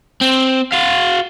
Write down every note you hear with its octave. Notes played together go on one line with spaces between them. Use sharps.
C4
F#4 F5